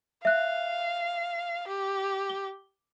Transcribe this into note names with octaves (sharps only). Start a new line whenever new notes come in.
E5 F5 F#6
G4
G7